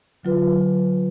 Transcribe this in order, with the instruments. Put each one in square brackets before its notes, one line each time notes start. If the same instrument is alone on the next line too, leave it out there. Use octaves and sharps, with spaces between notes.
[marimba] D3 F#3 F4 B4